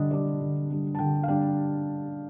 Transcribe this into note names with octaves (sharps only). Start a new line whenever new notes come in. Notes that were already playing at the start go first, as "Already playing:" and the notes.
Already playing: D3 G3 D4 D#5
G3 D4 D5
D3
G3 D4
A5
D3 G5
F5
G3 D4 G5